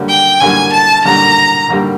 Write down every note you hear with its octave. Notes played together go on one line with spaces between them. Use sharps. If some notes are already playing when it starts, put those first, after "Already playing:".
Already playing: F#2 D3 G3 A#3
G5
F#2 D3 G3 A#3 G#5
A5
F#2 D3 G3 A#3 A#5
F#2 D3 G3 A#3